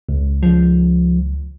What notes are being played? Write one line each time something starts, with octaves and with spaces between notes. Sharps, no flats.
C#2
F3